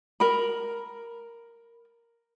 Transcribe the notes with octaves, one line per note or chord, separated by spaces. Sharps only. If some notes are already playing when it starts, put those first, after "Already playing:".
A#4 B5